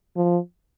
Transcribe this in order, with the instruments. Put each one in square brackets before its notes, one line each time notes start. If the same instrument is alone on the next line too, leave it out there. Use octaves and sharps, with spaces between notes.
[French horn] F3